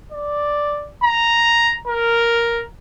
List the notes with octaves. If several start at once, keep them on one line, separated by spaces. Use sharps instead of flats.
D5
A#5
A#4